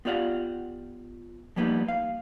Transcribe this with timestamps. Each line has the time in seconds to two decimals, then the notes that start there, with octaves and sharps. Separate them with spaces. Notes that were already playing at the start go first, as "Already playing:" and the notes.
0.05 B3 F4 G4 D5 F5 F#5
1.56 F3 G3 A#3 B3 C#4 D#4
1.88 F5